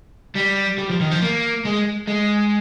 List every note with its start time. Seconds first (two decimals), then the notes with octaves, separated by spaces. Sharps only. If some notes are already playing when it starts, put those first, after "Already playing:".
0.35 G3
0.78 G3
0.90 F3
1.01 D#3
1.11 F3
1.22 A#3
1.65 G#3
2.08 G#3